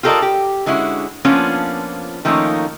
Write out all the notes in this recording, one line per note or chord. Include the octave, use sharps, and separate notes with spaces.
F4 G4 A4 A#4 D5 D#5
G4
D3 G#3 C#4 E4 F#4
F3 A#3 B3 C#4 D4 F4
D#3 F3 A3 A#3 C#4 D#4